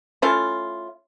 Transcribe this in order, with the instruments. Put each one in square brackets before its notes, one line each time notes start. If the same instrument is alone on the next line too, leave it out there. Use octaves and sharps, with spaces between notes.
[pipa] A3 C#4 E4 F4